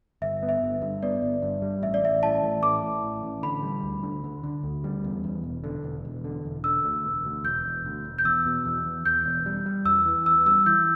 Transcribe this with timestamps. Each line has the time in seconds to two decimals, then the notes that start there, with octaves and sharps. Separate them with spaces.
0.22 G1 E5
0.43 B3
0.49 E5
0.62 G1
0.82 G2
1.03 B3 D5
1.22 G1
1.42 G2
1.62 G3
1.82 A1 E5
1.94 D5
2.02 A1 E5
2.23 A2 A5
2.42 A1
2.63 A2 D6
2.83 A2
3.03 A1
3.23 A1
3.43 D3 B5
3.63 G3
3.83 D2
4.03 D3
4.24 D3
4.43 D3
4.63 D2
4.84 G3
5.04 E2
5.24 E2
5.44 E1
5.64 D3
5.84 E1
6.05 E1
6.24 D3
6.45 E1
6.64 D3 E6
6.84 D2
7.04 E1
7.25 D2
7.44 E1 G6
7.66 E1
7.85 D2
8.05 E1
8.18 G6
8.25 E2 E6
8.46 B2
8.66 E2
8.85 E2
9.05 E2 G6
9.26 E1
9.46 G3
9.66 G3
9.85 E2 E6
10.06 E3
10.26 E2 E6
10.46 G3 E6
10.66 E3 G6